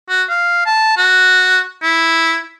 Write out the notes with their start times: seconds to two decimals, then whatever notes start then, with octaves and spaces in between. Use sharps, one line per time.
0.09 F#4
0.30 F5
0.66 A5
0.97 F#4
1.83 E4